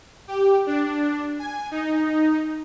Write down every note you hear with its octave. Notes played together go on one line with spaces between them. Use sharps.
G4
D4
G#5
D#4